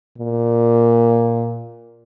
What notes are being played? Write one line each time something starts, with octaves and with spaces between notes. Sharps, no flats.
A#2